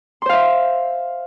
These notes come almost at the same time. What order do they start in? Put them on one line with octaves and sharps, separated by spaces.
C6 C5 F5 E5